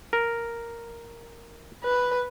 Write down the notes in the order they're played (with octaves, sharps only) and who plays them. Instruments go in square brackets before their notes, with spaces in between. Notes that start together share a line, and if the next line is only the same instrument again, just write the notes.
[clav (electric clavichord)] A#4
[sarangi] B4